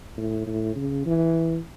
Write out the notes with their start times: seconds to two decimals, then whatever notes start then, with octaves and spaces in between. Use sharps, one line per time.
0.17 A2
0.47 A2
0.76 C#3
1.06 E3